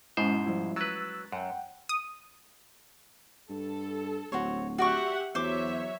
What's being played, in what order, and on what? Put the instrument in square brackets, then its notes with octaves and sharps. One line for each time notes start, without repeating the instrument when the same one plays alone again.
[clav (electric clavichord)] G#2 B2 C5 [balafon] G#3 C#4 [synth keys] E4
[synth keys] F3 G3 E4
[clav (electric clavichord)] F#3 B4 [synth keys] E6 F#6 A6
[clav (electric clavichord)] F#2 [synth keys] F#5 G5
[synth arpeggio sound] D#6
[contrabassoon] G2 [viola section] A4
[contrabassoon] D1 [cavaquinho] F#4 C5 C#5
[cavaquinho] F#4 D5 C#6 [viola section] G4 E5 F#5
[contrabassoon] E2 [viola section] F#3 C#5 E5 [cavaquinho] C5 D6